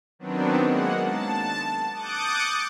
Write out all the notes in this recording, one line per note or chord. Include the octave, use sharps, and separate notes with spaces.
D#3 F#3 B3 C4 D4
G#3 A#3 F#5
A5
D6 D#6 F#6 G6 A6 C#7